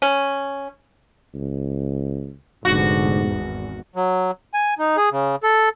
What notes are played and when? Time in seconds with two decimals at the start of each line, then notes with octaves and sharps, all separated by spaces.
0.02 C#4
1.34 C#2
2.65 F1 G#2 D3 B3 F#4
3.26 G#1 E2
3.96 F#3
4.54 G#5
4.79 D#4
4.97 G#4
5.12 C#3
5.43 A4